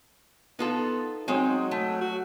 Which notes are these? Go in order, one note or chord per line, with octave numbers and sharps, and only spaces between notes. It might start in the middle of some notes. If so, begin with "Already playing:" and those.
B3 D#4 F4 A4
F#3 G#3 C4 D#4
A3
F#4